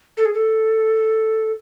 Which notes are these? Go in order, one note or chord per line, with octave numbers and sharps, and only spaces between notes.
A4
G#4
A4